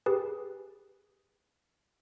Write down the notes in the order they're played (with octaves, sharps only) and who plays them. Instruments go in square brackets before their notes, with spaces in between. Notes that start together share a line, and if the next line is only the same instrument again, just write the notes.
[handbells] G4 G#4 B4